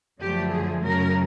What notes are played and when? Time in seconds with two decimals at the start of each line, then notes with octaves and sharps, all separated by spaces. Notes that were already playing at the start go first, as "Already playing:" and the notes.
0.20 F#2 D3 F3 A3 G4
0.51 G#4
0.83 F#2 C#3 F#3 A3 C#4 A#4